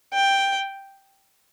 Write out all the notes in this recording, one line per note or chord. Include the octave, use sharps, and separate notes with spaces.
G5